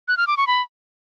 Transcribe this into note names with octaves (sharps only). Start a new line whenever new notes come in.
F#6
F6
D6
C#6
B5